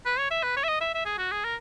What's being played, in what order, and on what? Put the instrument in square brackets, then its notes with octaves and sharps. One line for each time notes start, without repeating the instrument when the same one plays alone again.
[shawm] B4
C#5
E5
B4
C#5
E5
D#5
E5
E5
G#4
F#4
G#4
A#4